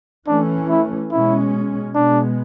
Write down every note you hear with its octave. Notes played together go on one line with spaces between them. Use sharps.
E3 A3 C#4 D4
E4
B2 G#3 C#4 E4
B2 G#3 B3 D4